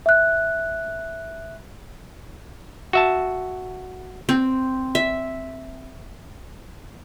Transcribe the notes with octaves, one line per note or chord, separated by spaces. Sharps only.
E5 F#6
F#4 E5 A5
C4
E5